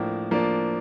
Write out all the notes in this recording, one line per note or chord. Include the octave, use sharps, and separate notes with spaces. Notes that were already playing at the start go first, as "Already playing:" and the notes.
Already playing: A2 F3 A#3 D4
F3 A#3 D4